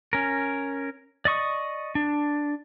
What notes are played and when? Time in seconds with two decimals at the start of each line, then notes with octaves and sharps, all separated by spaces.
0.13 C#4 A#4
1.25 D5 D#5 C#6 D#6
1.95 D4